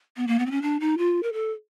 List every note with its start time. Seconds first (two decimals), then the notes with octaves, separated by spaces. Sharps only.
0.17 B3
0.27 A#3
0.39 B3
0.46 C4
0.51 C#4
0.62 D4
0.80 D#4
0.98 F4
1.23 A#4
1.33 A4